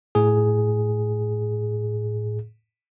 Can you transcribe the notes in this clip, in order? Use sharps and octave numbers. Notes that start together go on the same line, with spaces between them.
A2 G#4